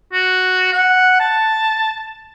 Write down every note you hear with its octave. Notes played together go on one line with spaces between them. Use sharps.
F#4
F#5
A5